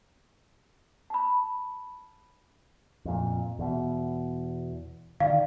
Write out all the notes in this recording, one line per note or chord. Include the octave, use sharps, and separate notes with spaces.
A5 B5
F2 A#2
E2 B2
D3 D#3 F5